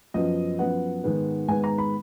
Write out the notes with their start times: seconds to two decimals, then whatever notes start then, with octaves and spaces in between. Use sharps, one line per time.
0.14 F#2 F3 B3 D#5
0.59 F#2 F3 B3 F#5
1.04 G#2 D#3 G#3 B3
1.48 G#2 D#3 G#3 B3 G#5
1.64 A#5
1.78 B5